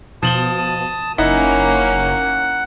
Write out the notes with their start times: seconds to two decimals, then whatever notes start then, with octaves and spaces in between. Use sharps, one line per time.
0.23 B2 F3 A5 D#6 F#7 G7
1.18 F#1 A#3 C#4 D#4 E4 F#5